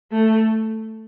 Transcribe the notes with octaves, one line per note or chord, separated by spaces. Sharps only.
A3